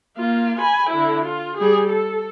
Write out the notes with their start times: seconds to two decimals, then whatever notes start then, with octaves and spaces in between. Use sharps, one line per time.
0.17 A#3 F4
0.59 G#5 B5
0.90 D3 E4
1.25 F4
1.58 G3 G#4
1.90 A4